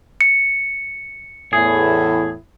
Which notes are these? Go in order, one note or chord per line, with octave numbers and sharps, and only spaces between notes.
C#7
E2 A2 E4 G#4